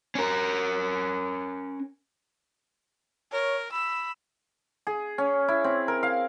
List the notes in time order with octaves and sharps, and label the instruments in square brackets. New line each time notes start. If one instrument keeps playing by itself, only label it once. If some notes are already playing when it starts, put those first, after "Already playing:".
[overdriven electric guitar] C#4 A#4
[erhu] A#4 [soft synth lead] C#5
[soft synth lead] B5 [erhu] E6
[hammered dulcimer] G#4
C#4
E4
C4
A#4
F5